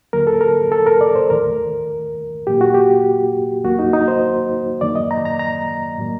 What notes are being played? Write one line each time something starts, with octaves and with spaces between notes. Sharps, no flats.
D#2 D3 F#3 A#3 A#4
A4
A#4
A4
A#4
D5
C5
D#2 D#3 A3 A#4
A#2 F#3 A#3 G4
F#4
G4
D#2 D#3 F#3 A#3 F#4
D#4
D#4
C5
F#2 D#3 F#3 A#3 D5
D#5
A#5
A#5
A#5
A2 F#3 A#3